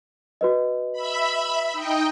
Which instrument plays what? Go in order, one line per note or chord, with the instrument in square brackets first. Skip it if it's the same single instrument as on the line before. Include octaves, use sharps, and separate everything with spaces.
[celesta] F#4 B4 D#5
[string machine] E5 B5
D#4 D#5 G5